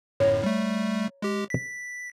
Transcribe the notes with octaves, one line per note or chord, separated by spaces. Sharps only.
G1 F#2 A2 C#5 A#5
G3 A3
G#3 G4
B6